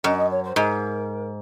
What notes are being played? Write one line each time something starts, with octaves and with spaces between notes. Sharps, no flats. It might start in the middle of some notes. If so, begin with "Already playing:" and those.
F#2 D#5
D#5
C#5
C5
G#2 A#4